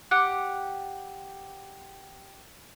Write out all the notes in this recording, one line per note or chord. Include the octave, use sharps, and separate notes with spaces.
G4 F#5